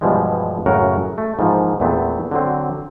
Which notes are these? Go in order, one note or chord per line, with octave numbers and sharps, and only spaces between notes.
G2 B2 E3 F3 G3 G#3
F#2 A2 C#3 F#3 A#4 F#5
A3
G#2 E3 F3 A#3
E2 A#2 A3 B3 C4
D3 F#3 C4